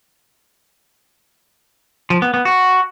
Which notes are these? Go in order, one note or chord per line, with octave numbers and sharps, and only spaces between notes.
F3
B3
B3
F#4